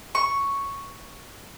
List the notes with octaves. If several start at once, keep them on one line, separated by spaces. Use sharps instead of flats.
C#6